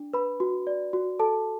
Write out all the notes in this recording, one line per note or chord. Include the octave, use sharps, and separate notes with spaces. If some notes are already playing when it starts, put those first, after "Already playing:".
Already playing: D4
B4 B5
F#4
D5
F#4
A4 A5